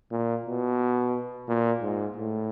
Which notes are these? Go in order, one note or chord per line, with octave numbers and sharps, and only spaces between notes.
A#2
B2
A#2
G#2
A2